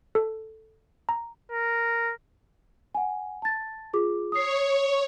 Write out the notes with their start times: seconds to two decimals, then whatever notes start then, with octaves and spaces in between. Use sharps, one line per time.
0.15 A4
1.09 A#5
1.52 A#4
2.95 F#5 G#5
3.42 A5 A6
3.93 F4 G#4 D6
4.32 C#5 D#6 C7